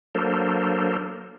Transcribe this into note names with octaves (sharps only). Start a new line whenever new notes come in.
F#3 A#3 D4 A4 A#4 C5